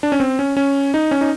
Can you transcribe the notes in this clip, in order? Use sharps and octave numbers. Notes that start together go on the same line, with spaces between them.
D4
C#4
C4
C#4
C#4
D#4
C#4
D#4